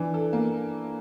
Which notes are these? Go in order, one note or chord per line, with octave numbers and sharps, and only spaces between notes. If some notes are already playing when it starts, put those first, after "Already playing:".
Already playing: E3 D4
A4
A#3